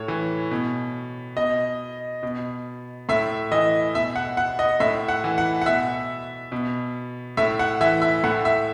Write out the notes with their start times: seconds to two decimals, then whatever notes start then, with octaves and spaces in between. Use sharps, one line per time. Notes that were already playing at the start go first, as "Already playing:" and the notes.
Already playing: A2 C#5
0.08 E3
0.51 B2
1.37 B2 D#5
2.23 B2
3.09 A2 E5
3.51 E3 D#5
3.95 B2 E5
4.16 F#5
4.37 F#5
4.59 D#5
4.80 A2 E5
5.08 F#5
5.24 E3
5.38 F#5
5.62 F#5
5.66 B2 E5
6.52 B2
7.37 A2 E5
7.59 F#5
7.81 E3 E5
8.02 E5
8.24 A2 F#5
8.45 E5